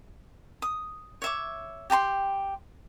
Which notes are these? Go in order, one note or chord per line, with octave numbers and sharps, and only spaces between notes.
D#6
C#5 E5 D6
G4 G5 A#5 C6